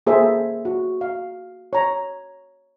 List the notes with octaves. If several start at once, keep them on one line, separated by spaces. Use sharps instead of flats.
A#3 G#4 A4 C5 E5
F#4
F5
C#5 A#5